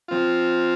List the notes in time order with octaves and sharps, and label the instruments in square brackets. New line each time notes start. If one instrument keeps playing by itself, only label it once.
[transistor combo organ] F3 C4 F4